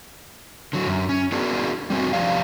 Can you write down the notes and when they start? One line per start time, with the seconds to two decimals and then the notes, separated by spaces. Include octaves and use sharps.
0.73 D3 F#3
0.87 F#2
1.09 C#4
1.32 B3 D4 F#4 G#4 A#4
1.90 G3 C4 F#4
2.13 F3 G4 D5 F5